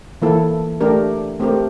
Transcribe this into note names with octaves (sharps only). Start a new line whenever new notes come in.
E3 A#3 E4 A4
A3 D4 G4 A#4
A3 C4 G4 A#4